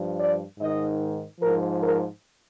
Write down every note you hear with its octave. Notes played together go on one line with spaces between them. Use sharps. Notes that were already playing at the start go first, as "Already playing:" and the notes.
Already playing: G2 F3
D5
G#2 D#3 D#5
G#2 F3 A#4
A#4